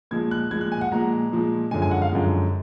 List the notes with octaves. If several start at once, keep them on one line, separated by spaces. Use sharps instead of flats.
A#2 F3 G#3 G#6
F#6
A#2 F3 G#3 G#6
F#6
G#5
F#5
A#2 F3 G#3 A#5
A#2 F3 G#3
F#2 D3 F3 G#3 G#5
G#5
F#5
F5
F#2 D3 F3 G#3